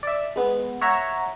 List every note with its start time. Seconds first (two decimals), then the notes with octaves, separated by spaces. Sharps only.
0.03 D5 E5
0.36 G#3 B3
0.81 C#5 E5 F#5 A#5